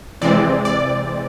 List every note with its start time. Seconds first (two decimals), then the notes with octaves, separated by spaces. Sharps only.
0.21 C3 E3 G#3 C4 D5
0.65 D5